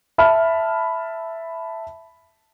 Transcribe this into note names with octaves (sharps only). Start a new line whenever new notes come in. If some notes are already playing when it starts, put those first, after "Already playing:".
E5 A5 B5 F6